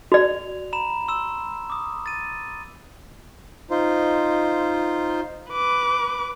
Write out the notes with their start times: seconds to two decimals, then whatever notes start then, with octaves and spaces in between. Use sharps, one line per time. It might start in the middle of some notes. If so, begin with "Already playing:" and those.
0.12 F#4 D5 F7
0.73 A#5 B5 E7
1.08 C6 E6 E7
1.70 D6 D#6
2.06 A6 D#7
3.70 D#4 F4 C5
5.50 B4 D6